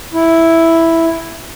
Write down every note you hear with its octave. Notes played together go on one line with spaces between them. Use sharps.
E4